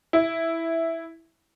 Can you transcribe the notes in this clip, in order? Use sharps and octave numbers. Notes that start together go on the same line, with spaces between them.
E4